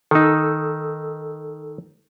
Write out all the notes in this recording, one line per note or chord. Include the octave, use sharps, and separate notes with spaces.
D#3 D#4 A4 E6